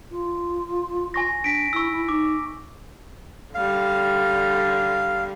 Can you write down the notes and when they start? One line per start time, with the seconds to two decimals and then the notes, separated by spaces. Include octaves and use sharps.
0.11 F4
1.14 G#5 C#6 A#6
1.44 D4 G#5 B6 D7
1.73 E4 C#6 E6
1.91 E4
2.09 D#4 D6
3.55 D3 G3 F5